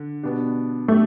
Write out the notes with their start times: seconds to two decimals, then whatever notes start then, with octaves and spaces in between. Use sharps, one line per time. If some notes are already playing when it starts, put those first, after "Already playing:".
Already playing: D3
0.23 B2 B3 D4 G4
0.88 B2 A3 B3 D4 G4